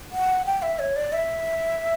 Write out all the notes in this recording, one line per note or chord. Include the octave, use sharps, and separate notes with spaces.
F#5
G5
E5
C#5
D5
E5